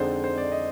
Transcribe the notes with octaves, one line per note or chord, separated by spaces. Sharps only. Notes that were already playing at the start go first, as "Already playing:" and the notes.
Already playing: F2 D3 G#3 C4 D#4 C5 D5
C5
D5
D#5